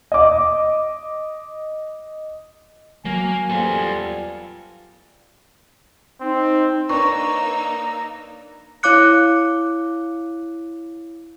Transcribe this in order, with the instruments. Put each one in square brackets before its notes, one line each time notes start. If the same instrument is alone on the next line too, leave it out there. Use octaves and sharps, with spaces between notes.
[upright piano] D#5 D6
[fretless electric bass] F#3 [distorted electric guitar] A#3 [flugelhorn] G#5
[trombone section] G3 B3 F4 [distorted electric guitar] A4 C5
[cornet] C4 [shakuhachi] D#4
[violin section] A#3 D#4 E6 [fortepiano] D4 B4 C#5 [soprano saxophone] A#5 [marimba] C#6
[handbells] E4 C#5 F5 D6 F#6 C#7